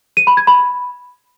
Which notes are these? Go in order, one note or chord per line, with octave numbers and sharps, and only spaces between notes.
D#7
B5
G#6
B5